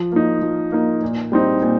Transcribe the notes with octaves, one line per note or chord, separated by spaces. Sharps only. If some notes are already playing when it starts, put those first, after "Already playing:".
Already playing: F3
A#3 D#4
F3
A#3 D#4
A#2
G3 C4 D#4
A#2